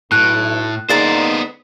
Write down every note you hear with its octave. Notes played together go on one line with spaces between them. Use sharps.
B1 A2 F#6
D3 A#3 B3 D#4 G#4 C5 D5 A#5